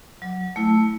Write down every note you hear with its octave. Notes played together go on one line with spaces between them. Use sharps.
F#3
A3 E4